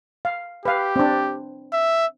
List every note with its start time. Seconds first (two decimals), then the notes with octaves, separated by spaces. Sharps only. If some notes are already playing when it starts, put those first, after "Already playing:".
0.25 F5
0.65 G4 B4 F5
0.96 C4 D4
1.73 E5